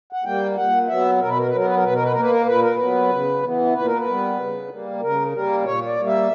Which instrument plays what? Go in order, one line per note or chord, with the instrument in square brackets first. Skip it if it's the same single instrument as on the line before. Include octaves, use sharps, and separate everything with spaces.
[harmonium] F#5
G3 A#3 G5
A#2 F#5
F#3 B3 E5
B2 A#4
B4
A#4
B4
F#3 B3 A#4
B4
A#4
B2 B4
A#4
B4
A#3 A#4
B4
A#4
A#2 B4
A#4
F#3 B3 B4
C#3
E3 B3
A#2 B4
A#4
B4
G3 B3
C#3
G3 A#3
C#3 A#4
G3 A#3 A#4
A#2 C#5
D5
G3 A#3
E5